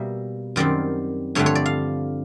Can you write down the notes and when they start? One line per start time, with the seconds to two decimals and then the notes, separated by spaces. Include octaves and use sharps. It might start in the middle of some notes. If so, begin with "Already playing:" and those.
Already playing: B2 G3 A#3 E5
0.56 F#2 D#3 G3 C4 D5
1.35 G2 D3 F3 A3 C4 C#5
1.46 C#5
1.55 D5
1.66 F5